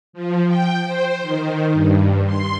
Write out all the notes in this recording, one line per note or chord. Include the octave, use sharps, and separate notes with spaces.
F3
G5
C5
D#3
G2
C6